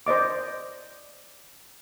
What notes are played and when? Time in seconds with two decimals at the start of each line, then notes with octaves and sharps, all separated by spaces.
0.07 C5 D5 D#5 D6